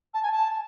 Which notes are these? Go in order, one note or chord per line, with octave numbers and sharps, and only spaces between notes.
A5
G#5
A5